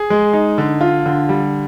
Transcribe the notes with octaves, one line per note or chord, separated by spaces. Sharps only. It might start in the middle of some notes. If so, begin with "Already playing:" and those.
Already playing: G#4
G#3
D#4
D3
F4
D3
G3